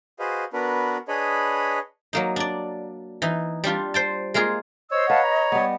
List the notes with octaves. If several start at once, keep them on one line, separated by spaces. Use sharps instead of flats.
F#4 G#4 B4 C5 D#5 F5
B3 D4 F#4 A#4 B4
D4 G#4 B4 C#5 D#5 B5
F#3 A#3 D#4
D4 D5
E3 D#4
G3 D4 F4 G4
C5 G5 A5
G#3 A#3 F4 G#4
C5 C#5 D#5 E6
B4 F5 F#5 A5
A#5
G3 B3